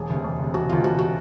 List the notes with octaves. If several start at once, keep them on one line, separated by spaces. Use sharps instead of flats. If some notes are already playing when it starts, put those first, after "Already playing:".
Already playing: E1 G#4
D2 C3
E1
D2 C3
E1 F#4
D2 C3 F4
E1 F#4
C3 F#4